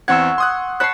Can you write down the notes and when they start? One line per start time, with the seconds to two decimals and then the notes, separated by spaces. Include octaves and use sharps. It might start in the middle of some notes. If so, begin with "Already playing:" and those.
0.08 E2 C4 F#5 C#6 E6 G#6
0.38 C6 D#6 F#6
0.80 C#5 A5 B5 F#6 C7